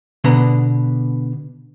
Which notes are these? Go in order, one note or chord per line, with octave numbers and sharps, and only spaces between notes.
B2 D3 B3 A#5